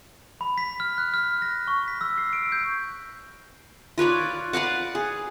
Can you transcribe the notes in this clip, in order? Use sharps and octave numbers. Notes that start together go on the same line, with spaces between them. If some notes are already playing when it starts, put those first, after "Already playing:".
B5
B6
F6
F#6
F6
A#6
C#6
B6
E6
C7
D7
G6
F4 B4 C#5 D5
B4 D5 F5 F#5
G#4